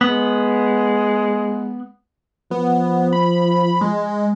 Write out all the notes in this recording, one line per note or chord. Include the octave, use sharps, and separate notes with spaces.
G#3 B3
F3 B3
B5
G#3